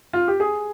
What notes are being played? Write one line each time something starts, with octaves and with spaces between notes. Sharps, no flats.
F4
G4
G#4